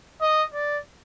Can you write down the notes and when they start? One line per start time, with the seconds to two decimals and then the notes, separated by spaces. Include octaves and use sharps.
0.21 D#5
0.54 D5